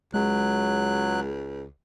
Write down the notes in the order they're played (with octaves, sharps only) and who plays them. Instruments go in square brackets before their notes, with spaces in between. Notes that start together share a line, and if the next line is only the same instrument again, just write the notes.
[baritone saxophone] C#2 [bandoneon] F#3 F#6 [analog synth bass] G#3